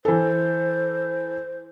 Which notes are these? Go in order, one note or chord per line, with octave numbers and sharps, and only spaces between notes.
E3 A4 C5